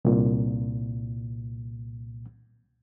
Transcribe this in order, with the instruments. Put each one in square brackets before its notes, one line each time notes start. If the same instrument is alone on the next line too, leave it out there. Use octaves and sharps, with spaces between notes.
[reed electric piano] C2 A#2